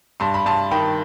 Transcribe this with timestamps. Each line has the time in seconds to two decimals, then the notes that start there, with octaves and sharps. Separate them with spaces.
0.20 G2 A5 C6
0.34 B5
0.46 G2 A5 C6
0.71 D#3 G5 B5